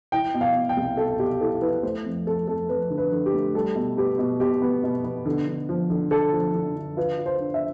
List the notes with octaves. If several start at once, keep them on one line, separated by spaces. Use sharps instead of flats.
E4 G5
B2
F5
B2
G5
C2
B2 A4
B2 G4
E4 A4
E4 B4
A3 C5
F2
F2 A4
F2 A4
F2 B4
D3
B4
D3
G4
A3
G3 A4
B2
B3 G4
B2
B2 G4
B3
B2
B3
D3
D3
F3
D3
D3 A4
F3
D3
D3
F4 B4
F4
C5
D4
E5